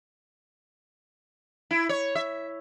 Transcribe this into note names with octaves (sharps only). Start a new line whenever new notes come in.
E4
C#5
E5